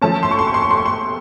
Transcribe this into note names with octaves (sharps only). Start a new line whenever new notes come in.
F3 A3 C#4 A5
C6
C#6
C6
C#6
C6
C#6
C6
C#6
C6